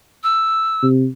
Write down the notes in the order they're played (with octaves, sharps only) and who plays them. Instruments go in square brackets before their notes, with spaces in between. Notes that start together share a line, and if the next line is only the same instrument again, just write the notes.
[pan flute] E6
[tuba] C3